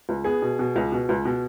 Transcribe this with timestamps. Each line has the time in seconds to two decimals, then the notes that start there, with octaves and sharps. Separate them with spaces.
0.09 C#2
0.24 B3 G#4
0.42 B2
0.59 B2
0.76 C#2
0.92 B2
1.09 C#2
1.25 B2